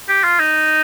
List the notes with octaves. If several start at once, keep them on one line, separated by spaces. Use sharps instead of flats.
G4
F4
D#4